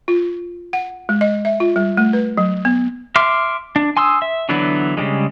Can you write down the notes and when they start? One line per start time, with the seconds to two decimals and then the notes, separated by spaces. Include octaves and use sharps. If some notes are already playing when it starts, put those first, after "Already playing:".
0.08 F4
0.73 F#5
1.09 G#3
1.21 D#5
1.45 E5
1.60 F4
1.76 G3
1.97 A3
2.13 B4
2.37 F#3
2.65 B3
3.16 E5 C6 D6 F6
3.76 D4
3.97 G#5 C6 D#6 E6
4.22 E5
4.49 D3 E3 F#3 B3 D4
4.97 C#3 F3 G3 G#3